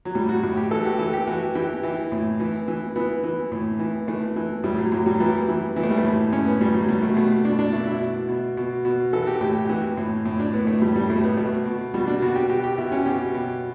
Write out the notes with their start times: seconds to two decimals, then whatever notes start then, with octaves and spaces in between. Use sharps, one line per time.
0.05 F#3
0.15 A2 G3
0.29 F#4
0.43 A2 F#4
0.57 G4
0.71 E3 A4
0.81 F#4
0.85 G4
0.99 E3 A4
1.13 G4
1.27 E3 F#4
1.55 E3 G4
1.83 E3
2.12 A2
2.40 E3
2.68 E3
2.96 E3 B3
3.24 E3
3.52 A2
3.79 E3
4.08 E3 A3
4.36 E3
4.64 A2 G3
4.78 F#3
4.92 A2 F#3
5.06 G3
5.14 F#3
5.20 E3 G3
5.48 E3
5.76 E3 B3
5.83 A3
5.90 G3
5.97 A3
6.04 A2
6.32 A2 C#4
6.46 B3
6.61 A2 G3
6.74 F#3
6.89 B2 G3
7.02 A3
7.16 B2 A3
7.45 B2 D4
7.59 D4
7.73 B2 E4
7.87 E4
8.01 B2
8.29 B2
8.57 B2
8.85 B2
9.13 E3 A4
9.22 F#4
9.27 G4
9.41 A2 G4
9.55 G4
9.69 E3 F#4
9.97 A2
10.25 A2
10.39 D4
10.54 A2 B3
10.67 A3
10.82 A2 G3
10.96 G3
11.10 A2 A3
11.24 B3
11.37 B2 A3
11.66 B2
11.94 B2 G3
12.07 D4
12.22 B2 F#4
12.35 G4
12.50 B2 G4
12.64 G4
12.78 B2 E4
12.92 C#4
13.06 B2 G4
13.34 B2